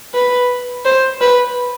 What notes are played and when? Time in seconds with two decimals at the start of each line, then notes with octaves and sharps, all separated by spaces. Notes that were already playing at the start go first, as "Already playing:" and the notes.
0.14 B4
0.85 C5
1.21 B4